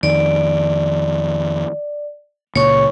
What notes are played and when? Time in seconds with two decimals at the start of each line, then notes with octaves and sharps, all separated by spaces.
0.03 F2 D#3 D5
2.56 C#2 A#2 C#5 C#6